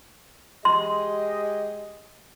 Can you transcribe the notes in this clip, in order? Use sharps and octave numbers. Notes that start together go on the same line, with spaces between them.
G#3 G4 D#5 C6